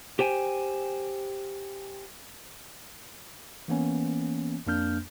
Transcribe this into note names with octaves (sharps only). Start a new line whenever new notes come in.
G4 C5 G5 G#5
E3 A#3 B3 C#4
F2 A#3 D4 F6 G6